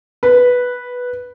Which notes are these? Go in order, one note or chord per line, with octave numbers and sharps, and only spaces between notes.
B4